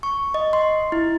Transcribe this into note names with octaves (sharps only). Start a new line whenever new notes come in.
C#6
D#5
C6
E4